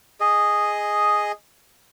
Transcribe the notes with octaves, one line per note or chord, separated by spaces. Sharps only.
G#4 D#5